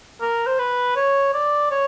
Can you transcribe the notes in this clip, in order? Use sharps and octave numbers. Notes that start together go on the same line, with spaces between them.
A#4
C5
B4
C#5
D5
C#5